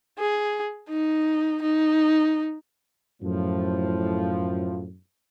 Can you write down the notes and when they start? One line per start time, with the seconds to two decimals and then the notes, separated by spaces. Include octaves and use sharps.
0.19 G#4
0.89 D#4
1.62 D#4
3.22 F#2 A2 F3